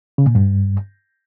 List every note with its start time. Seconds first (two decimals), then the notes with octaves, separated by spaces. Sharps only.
0.18 C#3
0.27 A#2
0.35 G2